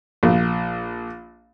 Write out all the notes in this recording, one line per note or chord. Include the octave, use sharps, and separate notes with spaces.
A#1